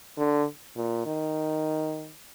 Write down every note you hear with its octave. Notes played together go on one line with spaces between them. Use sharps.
D3
A#2
D#3